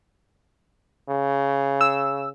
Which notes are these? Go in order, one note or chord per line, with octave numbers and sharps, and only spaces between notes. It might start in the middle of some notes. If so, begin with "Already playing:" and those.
C#3
E6